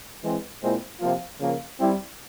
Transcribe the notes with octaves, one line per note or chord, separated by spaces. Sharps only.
E3 G#3 C4
A#2 G#3 C4 E4
C3 F3 A#3 F4
C#3 F3 A#3
G3 C4 E4